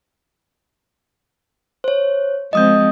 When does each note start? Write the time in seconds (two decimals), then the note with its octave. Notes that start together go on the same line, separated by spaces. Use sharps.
1.84 C5 C#5
2.53 F3 G#3 C4 D#5 D#6 G6